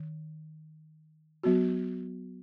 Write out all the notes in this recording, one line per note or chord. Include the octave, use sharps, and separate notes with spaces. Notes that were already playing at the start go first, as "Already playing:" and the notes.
Already playing: D#3
F#3 B3 F#4